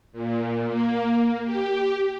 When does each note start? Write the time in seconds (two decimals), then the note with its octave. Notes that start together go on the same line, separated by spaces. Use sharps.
0.12 A#2
0.66 A#3
1.44 G4